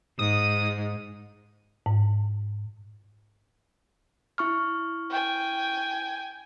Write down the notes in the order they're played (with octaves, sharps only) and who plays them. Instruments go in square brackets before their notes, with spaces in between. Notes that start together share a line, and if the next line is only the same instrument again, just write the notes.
[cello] G#2 [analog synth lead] D#6
[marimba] G#2
[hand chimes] E4 C#6 F6
[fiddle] G5 G#5